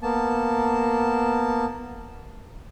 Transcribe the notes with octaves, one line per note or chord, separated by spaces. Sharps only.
A#3 B3 A5